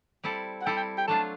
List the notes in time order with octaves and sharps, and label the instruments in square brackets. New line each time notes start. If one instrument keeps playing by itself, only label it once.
[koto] G3 C4 E4 A4
[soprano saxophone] F#5
[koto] G3 C4 E4 A4 [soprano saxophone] G5
[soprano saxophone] G5
G5
[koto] F#3 A3 D4 F4 [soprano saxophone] A5